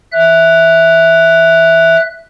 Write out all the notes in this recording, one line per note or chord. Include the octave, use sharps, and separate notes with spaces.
E5 F#6